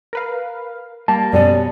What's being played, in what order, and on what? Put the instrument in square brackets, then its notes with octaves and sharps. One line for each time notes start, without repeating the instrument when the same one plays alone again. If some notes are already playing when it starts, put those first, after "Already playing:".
[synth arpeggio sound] A#4 B4 F5
[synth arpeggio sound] G3 [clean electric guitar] A#3 [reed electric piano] A5
[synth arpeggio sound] F#2 G3 [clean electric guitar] B2 C#4 [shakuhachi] D5